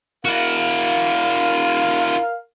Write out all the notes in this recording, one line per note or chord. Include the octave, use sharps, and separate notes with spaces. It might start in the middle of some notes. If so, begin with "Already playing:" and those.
E4 F#4 A#4 F5